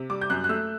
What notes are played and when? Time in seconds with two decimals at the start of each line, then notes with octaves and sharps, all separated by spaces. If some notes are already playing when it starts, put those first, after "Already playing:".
Already playing: C3
0.10 G3 D6
0.21 G6
0.30 F#2 F#6
0.44 F#6
0.49 A3 E6